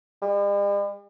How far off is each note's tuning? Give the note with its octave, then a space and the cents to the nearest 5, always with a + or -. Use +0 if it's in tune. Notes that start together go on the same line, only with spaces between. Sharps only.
G3 +45